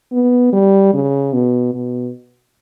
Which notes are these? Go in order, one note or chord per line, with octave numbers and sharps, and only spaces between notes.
B3
G3
C#3
B2
B2